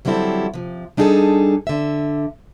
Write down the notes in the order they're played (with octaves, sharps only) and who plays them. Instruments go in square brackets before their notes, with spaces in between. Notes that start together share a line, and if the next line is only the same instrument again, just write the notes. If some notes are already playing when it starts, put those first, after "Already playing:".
[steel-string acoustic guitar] D3 F#3 G3 C4 E4 A4
C3 F3
G3 D4 D#4 F#4 G#4 A4
D3 E5